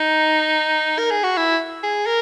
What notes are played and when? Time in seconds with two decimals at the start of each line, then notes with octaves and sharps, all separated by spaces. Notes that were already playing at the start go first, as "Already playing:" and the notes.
Already playing: D#4
0.98 A#4
1.11 G#4
1.24 F#4
1.37 E4
1.83 G#4
2.06 A#4